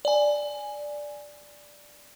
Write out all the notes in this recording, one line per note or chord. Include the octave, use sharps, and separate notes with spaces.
D5 G#5